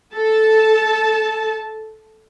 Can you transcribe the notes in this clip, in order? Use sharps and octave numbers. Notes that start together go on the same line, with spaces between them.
A4 A5